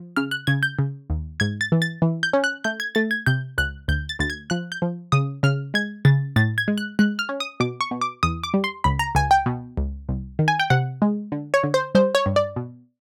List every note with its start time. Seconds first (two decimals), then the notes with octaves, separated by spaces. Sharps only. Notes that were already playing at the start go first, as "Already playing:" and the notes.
Already playing: F3
0.16 C#3 F6
0.31 F#6
0.47 C#3 G#6
0.63 G6
0.79 C#3
1.10 D#2
1.40 G#2 G#6
1.61 A6
1.72 E3
1.82 A6
2.02 E3
2.23 G6
2.33 C#4
2.44 F#6
2.64 A3 G6
2.80 G#6
2.95 A3 A6
3.11 G#6
3.26 C3 G6
3.58 C#2 F#6
3.88 D2 G6
4.09 A6
4.19 D2 A6
4.30 G#6
4.50 F3 F#6
4.72 G6
4.82 F3
5.12 C#3 D#6
5.43 C#3 F6
5.74 G#3 G#6
6.05 C#3 A6
6.36 A2 A6
6.58 G#6
6.68 G#3
6.78 F#6
6.99 G#3 F#6
7.19 F6
7.29 C#4
7.40 D#6
7.60 B2 D6
7.81 C#6
7.91 B2
8.01 D6
8.23 E2 D#6
8.44 D6
8.54 G3
8.64 C6
8.84 C#2 B5
8.99 A#5
9.15 C#2 G#5
9.31 G5
9.46 B2
9.78 C#2
10.09 C2
10.39 D#3
10.48 G#5
10.60 G5
10.70 C3 F#5
11.02 G#3
11.32 D3
11.54 C#5
11.63 D3
11.74 C5
11.95 G3 C5
12.15 C#5
12.26 G2
12.36 D5
12.56 B2